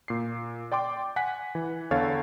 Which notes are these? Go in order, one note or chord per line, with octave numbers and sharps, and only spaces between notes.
A#2 C7
D5 G5 C6 D6
F#5 G#5 F#6 B6
E3
E2 D3 A4 C#5 F5 A6